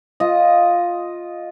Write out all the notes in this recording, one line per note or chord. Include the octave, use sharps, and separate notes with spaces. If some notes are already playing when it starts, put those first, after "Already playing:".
F4 D#5